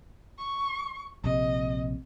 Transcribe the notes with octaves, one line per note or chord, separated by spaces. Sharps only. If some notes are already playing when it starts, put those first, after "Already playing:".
C#6
A#1 C3 D#5